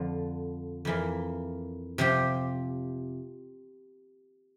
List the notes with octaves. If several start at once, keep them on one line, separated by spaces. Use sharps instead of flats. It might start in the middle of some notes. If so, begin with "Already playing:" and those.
Already playing: F2 D3 F3
F2 E3 A#3
C3 F3 C4 G4